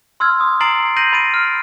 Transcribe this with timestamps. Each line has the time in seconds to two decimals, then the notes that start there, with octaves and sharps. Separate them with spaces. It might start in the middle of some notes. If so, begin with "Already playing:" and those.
0.20 C6 E6 F6 G#6
0.41 D#6
0.61 A#5 A6 C7 D7 F#7
0.96 G6 A#6 C7 D#7 F#7
1.13 B5 A6 D7 D#7
1.34 F6